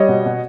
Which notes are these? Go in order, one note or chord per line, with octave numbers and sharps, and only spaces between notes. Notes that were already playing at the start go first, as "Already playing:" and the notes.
Already playing: G3 C#5 D#5
B2
B2